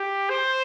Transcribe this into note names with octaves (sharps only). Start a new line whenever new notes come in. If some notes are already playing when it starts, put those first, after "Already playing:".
Already playing: G4
C5